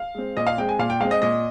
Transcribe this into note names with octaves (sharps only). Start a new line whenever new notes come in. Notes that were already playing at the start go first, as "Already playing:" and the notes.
Already playing: F5
G#3 C4
A#2 D#5
F5
G#3 C4 G5
G#5
A#2 F5
G5
G#3 C4 F5
D#5
A#2 D#5